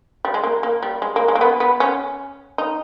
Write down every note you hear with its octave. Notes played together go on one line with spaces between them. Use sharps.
G3
G#3
A#3
A#3
G3
G#3
A#3
G#3
A#3
B3
B3
C#4
D#4